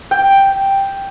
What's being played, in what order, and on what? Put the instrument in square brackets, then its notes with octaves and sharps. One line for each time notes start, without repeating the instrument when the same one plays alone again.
[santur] G5